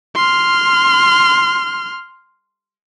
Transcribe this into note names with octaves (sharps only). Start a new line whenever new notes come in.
C6 F6